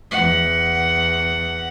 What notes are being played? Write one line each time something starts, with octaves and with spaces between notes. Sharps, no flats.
E2 F#5